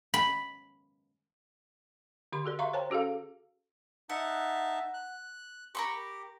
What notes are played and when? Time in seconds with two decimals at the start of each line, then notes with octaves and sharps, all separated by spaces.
0.14 B5
2.32 D3 G4 C6
2.44 F#4 G#4 A#4 D5
2.59 E5 F5 A#5 C6 C#6
2.73 A#4 C5 C#5 G5 A5 A#5
2.90 C#4 F#4 G#4 A4 F5
4.10 D#4 E5 F#5 A5
4.94 F#6
5.75 G4 A#4 B5 C#6